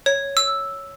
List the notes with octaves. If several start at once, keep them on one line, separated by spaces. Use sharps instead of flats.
C#5
E6